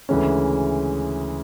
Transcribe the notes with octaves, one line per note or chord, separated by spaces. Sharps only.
D2 C#3 E3 G#3 C#4